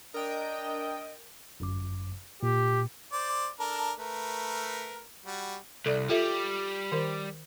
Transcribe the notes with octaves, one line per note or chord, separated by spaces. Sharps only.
D4 A#4 D#5 G5
G1 F#2 D6
A#2 G4
C5 D5
D4 A4 A#4
A3 A#4 B4
G3 F#4
C2 A4 D5
G3 F4 A4 E5
D#3 A#4 C5